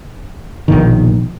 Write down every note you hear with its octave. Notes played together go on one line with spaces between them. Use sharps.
A#1 B2 D#3